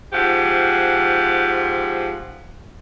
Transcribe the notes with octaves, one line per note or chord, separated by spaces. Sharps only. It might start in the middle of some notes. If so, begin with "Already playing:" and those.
G#2 F3 G4 F#5